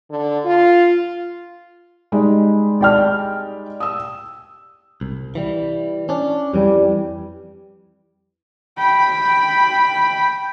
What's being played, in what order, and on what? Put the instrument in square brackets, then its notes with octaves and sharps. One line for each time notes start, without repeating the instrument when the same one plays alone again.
[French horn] D3
F4
[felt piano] G3 G#3 D#4
[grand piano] D5 G5 F6
[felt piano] D#6 E6
[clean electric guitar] C2
E3 G3
C#4 D4
[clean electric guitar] F2 E3 [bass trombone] G3
[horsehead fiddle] G5 B5